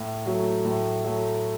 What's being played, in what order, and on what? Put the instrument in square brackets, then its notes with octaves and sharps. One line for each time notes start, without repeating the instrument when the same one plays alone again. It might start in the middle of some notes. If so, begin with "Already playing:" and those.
Already playing: [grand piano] A2
F#3 A3
A2
F#3 A3